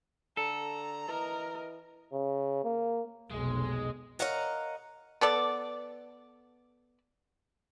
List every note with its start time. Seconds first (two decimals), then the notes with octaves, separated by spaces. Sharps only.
0.37 D3 A4 A#5
1.08 E3 A#4 D#5
2.13 C#3
2.64 A#3
3.31 F1 B1 G#3
4.19 A#4 C#5 D#5 F5 F#5 A#5
5.21 B3 A4 D5